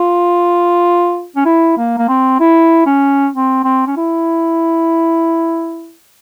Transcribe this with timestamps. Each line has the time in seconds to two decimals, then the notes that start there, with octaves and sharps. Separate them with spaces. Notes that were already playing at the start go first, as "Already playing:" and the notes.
Already playing: F4
1.36 C#4
1.46 E4
1.77 A#3
1.98 A#3
2.09 C4
2.40 E4
2.86 C#4
3.34 C4
3.64 C4
3.87 C#4
3.96 E4